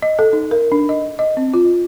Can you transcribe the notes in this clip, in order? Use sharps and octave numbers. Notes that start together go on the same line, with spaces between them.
D#5
A4
D#4
A#4
D4
D#5
D#5
C4
F4